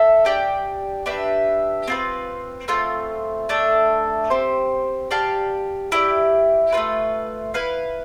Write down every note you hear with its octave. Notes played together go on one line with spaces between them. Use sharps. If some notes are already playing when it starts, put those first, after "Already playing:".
Already playing: A4 E5
D4 G4 D5 G5
D4 G4 B4 E5
C4 F4 B4
A3 C4 F4
A3 D4 A4
C4 G4 C5
G4 D5 F5 A5
E4 G4 D5
A3 D4 F4 B4
E4 B4 F5